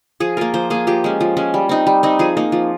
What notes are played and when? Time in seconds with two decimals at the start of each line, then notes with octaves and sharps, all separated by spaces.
0.20 F3 G#4
0.37 A#3 F4 A#4
0.54 F3 C5
0.70 A#3 F4 G#4
0.87 F3 G4
1.04 G#3 C#4
1.20 F3
1.37 G#3 C#4
1.54 G3
1.69 C4 D#4
1.87 G3
2.03 C4 D#4
2.19 F3 G#4
2.37 A#3 D#4
2.52 F3